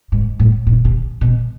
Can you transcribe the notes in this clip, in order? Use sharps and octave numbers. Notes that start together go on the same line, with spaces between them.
G#2
A2
A#2
C3
B2